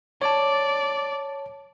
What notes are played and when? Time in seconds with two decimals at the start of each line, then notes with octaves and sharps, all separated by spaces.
0.22 C#5 D5 A5